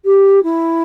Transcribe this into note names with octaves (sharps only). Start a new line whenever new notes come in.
G4
E4